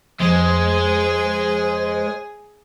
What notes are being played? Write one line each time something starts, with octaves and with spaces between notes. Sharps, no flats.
F2 G#3 G#4 C5